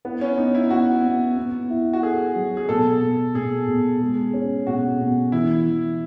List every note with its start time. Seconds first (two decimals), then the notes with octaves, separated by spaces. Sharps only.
0.05 B3 E4
0.21 C#4
0.38 B3 D#4
0.55 E4
0.70 B3 F#4
1.04 B3
1.37 B3
1.70 E4
1.93 F#4
2.02 G#4 A4
2.36 F#3
2.57 G#4
2.69 B2 A4
3.02 B2
3.35 B2 G#4
3.68 B2
4.01 G#3
4.34 C#4
4.67 B2 F#4
5.00 B2
5.32 E3 E4
5.66 E3